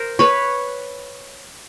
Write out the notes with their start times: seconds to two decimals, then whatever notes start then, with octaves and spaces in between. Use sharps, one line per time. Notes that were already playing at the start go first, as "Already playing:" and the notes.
Already playing: A#4 C5
0.19 B4 C#5